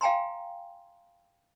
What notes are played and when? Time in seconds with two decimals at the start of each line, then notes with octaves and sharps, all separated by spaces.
0.01 F5 G5 G#5 A#5 C6